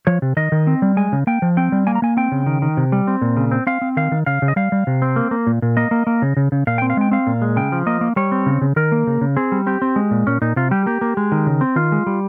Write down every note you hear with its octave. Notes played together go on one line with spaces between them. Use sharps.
F3 C#5
C3
D#3 D#5
D#3
C4
G3
G#3 G#5
C#3
A#3 G5
F3
C4 G5
G3
A#3 G#5
A#5
A#3 G#5
C4 G5
C#3
D#3
D#3
C3
G3
C4
A#2
C#3
C4
C4 F5
C4
D#3 F5
D#3
C#3 F5
C#3
D#5
G3 F5
G3
C3
C4
A#3
A#3
A#2
A#2
A#3 D#5
A#3
A#3
C#3
C#3
C#3
A#2 F5
C4 G5
F5
G#3 G5
C4 F5
A#2
G#3
C#3 G5
F3
A#3 D#5
A#3
G3 C#5
C4
C#3
C#3
D#3 A#4
A#3
C#3
C#3
C4 G#4
G3
C4 G4
C4
G#3
A#2
A#2 C#4
A#2 D#4
C3 F4
G3 G4
A#3 G4
A#3
G#3
D#3
C#3
C4
D#3 F4
G#3
G3